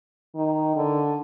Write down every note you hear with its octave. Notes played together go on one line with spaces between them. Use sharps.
D#3
D3